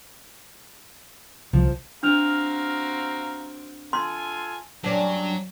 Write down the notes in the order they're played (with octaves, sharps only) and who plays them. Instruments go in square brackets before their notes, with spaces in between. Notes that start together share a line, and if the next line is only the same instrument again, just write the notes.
[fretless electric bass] C2 [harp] F3
[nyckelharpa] C4 F#4 [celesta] D4 F6 F7 [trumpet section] F5 A#5
[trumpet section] F4 A4 G#5 [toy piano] C6
[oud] G2 C#4 D4 [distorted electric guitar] F#3